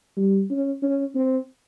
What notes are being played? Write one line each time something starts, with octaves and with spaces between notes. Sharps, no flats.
G3
C#4
C#4
C4